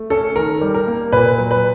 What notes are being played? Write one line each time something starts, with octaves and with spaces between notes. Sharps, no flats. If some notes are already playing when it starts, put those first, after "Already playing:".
Already playing: A3
C#4 A4
D#3 A#4
G3
A#4
A#3
A#2 B4
F#3
B4